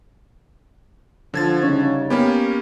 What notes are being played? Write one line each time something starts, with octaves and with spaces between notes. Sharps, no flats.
D3 F3 G#6 A6
C#3 G3 C#4 D#4
A#3 B3 C#4 G4